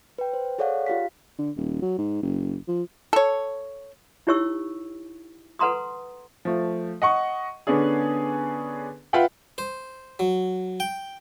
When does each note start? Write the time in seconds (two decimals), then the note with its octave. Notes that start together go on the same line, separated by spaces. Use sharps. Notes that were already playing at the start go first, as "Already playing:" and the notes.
0.18 B4 G5
0.33 C5
0.58 G#4 A4 C#5 D5 F5 F#5
0.86 F4 G4 F5 B6
1.39 D3
1.57 D#1
1.82 F#3
1.98 G#2
2.23 F#1
2.68 F3
3.13 A4 C#5
4.27 D#4 E4 G4 C#5 C#6 E6
5.59 A4 B4 F#5 A#5 C6 D#6
6.45 F3 A3
7.02 D#5 F#5 C#6
7.67 D3 B3 C#4 D4 G#4
9.13 F4 B4 E5 F#5 G5
9.58 C5
10.19 F#3
10.80 G5